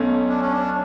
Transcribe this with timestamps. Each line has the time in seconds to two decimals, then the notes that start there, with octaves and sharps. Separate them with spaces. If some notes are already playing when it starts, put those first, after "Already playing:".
Already playing: B1 B2 A3 C#4
0.28 D4
0.41 C#4
0.53 D4